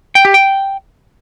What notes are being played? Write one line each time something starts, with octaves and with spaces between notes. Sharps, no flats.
G5
G4
G5